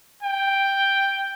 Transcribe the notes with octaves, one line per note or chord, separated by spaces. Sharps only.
G5